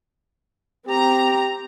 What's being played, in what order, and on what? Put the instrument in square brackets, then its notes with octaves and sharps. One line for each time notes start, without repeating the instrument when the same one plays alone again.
[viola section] C4 A#5 [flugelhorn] G4